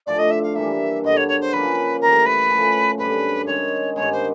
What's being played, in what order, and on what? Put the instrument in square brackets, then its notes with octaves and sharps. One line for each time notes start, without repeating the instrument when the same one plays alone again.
[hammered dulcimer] A2 F3 A3 D4 [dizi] D5
[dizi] D#5
E5
F5
[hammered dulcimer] E3 G3 A#3 [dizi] E5
[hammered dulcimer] G2 D3 F#3 B3 [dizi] D#5
[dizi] C#5
C#5
C5
[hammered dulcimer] C#3 F3 A#3 [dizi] B4
[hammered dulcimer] A2 E3 G3 [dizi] A#4
[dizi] B4
[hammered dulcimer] C#3 F3 A3
[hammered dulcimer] F#2 D3 G3 C4 [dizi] B4
[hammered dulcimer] D#3 G#3 C#4 [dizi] C#5
[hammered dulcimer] G2 D#3 G#3 B3 [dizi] C#5
[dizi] C5